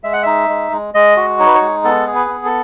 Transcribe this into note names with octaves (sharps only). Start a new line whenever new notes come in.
G#3 E5
F#5
D#4 E5
G#3
G#3
G#3 D#5
F#4
D#4 C#5
B4
C#5
G#3
B3 A4
G#4
B4
B3
A4